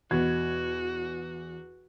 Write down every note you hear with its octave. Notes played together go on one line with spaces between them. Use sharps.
E2 B2 F#4 G#6